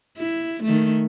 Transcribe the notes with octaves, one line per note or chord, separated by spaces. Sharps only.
E4
D#3 A3